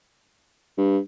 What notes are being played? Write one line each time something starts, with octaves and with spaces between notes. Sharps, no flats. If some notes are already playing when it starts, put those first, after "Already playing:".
G2